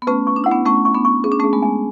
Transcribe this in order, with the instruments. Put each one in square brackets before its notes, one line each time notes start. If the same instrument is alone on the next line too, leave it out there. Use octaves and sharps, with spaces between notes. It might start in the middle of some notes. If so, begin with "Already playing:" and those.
[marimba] B3
[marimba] A3 C#4 [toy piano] B4
[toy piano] C#6
[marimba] D4
[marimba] E4 [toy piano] F#5
[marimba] B3 D4
[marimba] A3 C#4 [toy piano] C#6
[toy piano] C#6
[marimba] B3 D4
[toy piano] C#6
[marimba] C#4 [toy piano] G#4
[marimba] D4
[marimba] A3 C#4 [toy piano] G#4
[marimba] G#3 B3
[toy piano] G#5